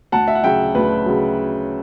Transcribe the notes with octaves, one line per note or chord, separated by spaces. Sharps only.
D2 F#5 A5
E5
F#5
C#3 F#3 E5 G5
D2 B4
C#3 F#3